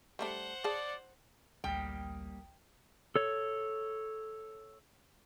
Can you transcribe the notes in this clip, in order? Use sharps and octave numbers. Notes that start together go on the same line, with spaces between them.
G3 A3 D4 C5 F#5
G#4 D5 A5
A1 D2 G3 A#3 G5 D#6
A4 C#5